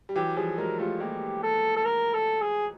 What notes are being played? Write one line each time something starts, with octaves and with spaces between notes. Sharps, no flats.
G3
E3 F#3 G4
F3 G3 G#4
F#3 G#3 A#4
G3 A3 F4
G#3 A#3 G4
A4
A4
A#4
A4
G#4